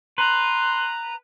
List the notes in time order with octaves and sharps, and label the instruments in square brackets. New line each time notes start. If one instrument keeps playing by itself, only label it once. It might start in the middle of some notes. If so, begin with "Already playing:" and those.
[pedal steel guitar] B4 [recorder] A#5 [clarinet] C6